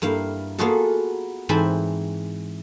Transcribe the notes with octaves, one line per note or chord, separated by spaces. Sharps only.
G2 A#3 E4 F5
A#3 B3 F4 F#4 G#4 A4
G#2 E3 C4 G#5 A5 B5